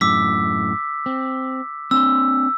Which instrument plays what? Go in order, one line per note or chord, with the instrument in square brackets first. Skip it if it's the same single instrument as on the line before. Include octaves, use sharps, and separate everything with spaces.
[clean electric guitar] F#2 A2 [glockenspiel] D6 E6 B6
[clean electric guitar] C4
[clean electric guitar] C4 D4 C6 [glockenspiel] E6